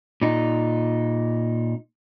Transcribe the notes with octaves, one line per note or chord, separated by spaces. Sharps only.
A#2 D#4